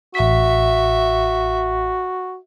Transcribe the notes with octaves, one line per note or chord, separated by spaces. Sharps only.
A1 F#4 E5 B6